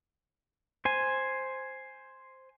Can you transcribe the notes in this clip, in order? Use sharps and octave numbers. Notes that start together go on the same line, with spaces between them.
C5 G#5